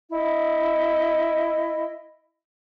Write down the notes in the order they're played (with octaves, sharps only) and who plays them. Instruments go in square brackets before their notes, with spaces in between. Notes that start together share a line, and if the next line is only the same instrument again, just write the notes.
[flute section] E4 D#5